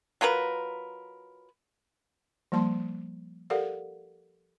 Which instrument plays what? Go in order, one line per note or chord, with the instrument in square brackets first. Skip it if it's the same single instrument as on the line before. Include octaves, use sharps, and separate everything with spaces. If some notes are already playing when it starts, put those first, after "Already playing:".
[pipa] F#3 F4 A#4 B4
[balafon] F3 G3 A#3 A5 C6
G4 A4 A#4 D5 F5 F#5